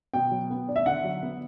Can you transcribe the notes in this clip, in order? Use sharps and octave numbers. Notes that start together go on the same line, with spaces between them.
B2 G5
F#3
B3
D4
E5
D3 F#5
F#3
B3